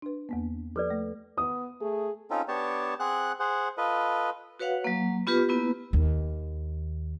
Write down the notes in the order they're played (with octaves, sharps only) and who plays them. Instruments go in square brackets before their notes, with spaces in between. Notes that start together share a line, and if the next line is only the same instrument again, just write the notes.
[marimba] D4 B4
E2 A#3 B3
[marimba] F3 [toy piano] A4 B4 D5
[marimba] A3
[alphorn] B3 [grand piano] D#6
[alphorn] A3 [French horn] G#4
[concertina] C4 C#4 D#4 F4 A4
B3 D4 G4 C#5 A5
C4 G#4 F#5 F#6
G#4 C5 F#5
F4 A4 B4 D#5
[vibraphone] F#4 B4 C#5 F5 F#5
F#3 A#3
B3 F4 G4 B4
A#3 B3 E4 B4
[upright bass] D#2